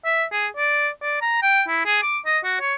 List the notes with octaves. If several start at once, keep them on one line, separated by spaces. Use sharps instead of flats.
E5
G#4
D5
D5
A#5
G5
E4
G#4
D6
D#5
F#4
C#5